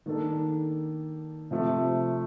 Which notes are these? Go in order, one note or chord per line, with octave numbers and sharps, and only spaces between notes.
D#3 A#3 D4 A4
C3 F3 A3